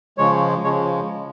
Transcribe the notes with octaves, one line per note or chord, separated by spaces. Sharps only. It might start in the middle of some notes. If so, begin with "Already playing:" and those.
C#3 F3 G#3 C#5
C#3 F3 G#3 C#5